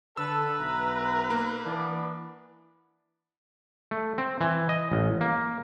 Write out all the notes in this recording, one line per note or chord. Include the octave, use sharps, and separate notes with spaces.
D3 A4 B4 E6
B1 E5 A#5
A#3
E3 B3 D4
A3
C4
E3
D#5
A1
A#3